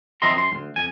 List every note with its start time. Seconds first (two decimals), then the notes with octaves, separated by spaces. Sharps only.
0.22 F3 C4 D#5 E5 A#5 C6
0.34 F#2 C6
0.52 D2 G2
0.76 F2 G#5